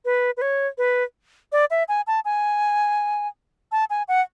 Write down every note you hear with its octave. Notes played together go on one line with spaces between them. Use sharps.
B4
B4
C#5
B4
D5
E5
G#5
A5
G#5
A5
G#5
F#5